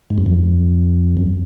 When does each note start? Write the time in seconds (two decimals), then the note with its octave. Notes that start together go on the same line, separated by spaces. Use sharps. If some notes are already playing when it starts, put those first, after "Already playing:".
0.10 G#2
0.18 F#2
0.26 F2
1.17 F#2